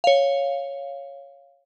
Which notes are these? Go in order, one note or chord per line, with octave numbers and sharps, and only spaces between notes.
C#5 F5